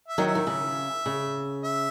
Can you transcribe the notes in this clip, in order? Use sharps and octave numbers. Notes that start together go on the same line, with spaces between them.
E5
D#3 F#3
E5
D#3
C#3
C#3
E5